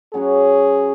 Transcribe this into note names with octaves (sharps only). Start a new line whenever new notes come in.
F#3 C#4 F#4 G#4